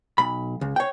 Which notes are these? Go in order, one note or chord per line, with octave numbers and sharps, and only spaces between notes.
B1 B5
C#2
C#5 G5